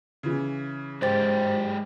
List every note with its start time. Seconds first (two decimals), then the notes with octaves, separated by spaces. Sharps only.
0.23 C#3 E3
1.02 G#2 G#3 G4 C5 G5 A6